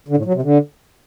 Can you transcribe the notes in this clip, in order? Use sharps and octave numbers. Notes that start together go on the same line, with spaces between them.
D3
A2
F#3
C3
D3